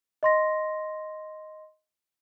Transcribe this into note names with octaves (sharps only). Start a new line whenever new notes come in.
D#5 C6 A#6